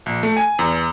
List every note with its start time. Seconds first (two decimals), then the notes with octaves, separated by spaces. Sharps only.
0.06 A#1
0.23 A3
0.37 G#5
0.59 E2